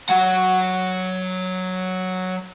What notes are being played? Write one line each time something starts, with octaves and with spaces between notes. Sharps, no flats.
F#3 F#5